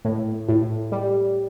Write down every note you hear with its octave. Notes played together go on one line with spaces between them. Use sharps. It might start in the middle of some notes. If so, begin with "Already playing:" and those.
A2
A2
G3